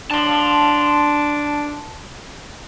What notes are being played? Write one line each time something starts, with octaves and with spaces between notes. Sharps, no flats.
D4 A5 C6